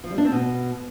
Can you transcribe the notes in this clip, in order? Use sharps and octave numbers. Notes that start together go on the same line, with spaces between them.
F3
G3
D4
C4
B2